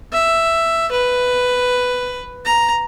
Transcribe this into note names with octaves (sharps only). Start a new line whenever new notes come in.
E5
B4
A#5